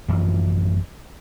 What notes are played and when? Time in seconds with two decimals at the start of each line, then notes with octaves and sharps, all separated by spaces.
0.08 A1 F#2 E3 F3